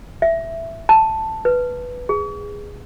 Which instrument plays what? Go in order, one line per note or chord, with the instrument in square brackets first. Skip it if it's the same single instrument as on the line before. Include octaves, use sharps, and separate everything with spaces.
[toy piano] E5
A5
B4
G#4